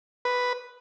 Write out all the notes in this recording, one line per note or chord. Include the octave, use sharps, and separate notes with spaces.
B4